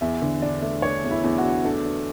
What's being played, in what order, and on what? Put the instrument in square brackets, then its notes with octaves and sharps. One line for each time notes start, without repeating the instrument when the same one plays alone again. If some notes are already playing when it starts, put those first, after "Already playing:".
[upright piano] E2 [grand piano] E5
[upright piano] D3
[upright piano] D4 [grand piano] D5
[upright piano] A3
[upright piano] D4 [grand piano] C#5
[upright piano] E2
[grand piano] E4
[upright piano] E2
[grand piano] F#4
[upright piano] D4
[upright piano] D4 [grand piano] A4
[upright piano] D4